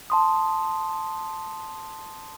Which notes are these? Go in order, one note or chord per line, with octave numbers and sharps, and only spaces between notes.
A5 C6 D#6